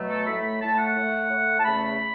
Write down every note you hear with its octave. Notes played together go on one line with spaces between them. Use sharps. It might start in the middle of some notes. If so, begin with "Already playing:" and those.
Already playing: B2 F#3 A3
A4
A2 A3 B5
A2 A3 A5
F#5
A2 A3
A2 A3
A5
E2 C#3 A3 B5